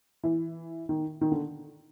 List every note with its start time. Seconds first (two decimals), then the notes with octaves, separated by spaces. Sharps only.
0.23 E3
0.89 D#3
1.21 D#3
1.32 D3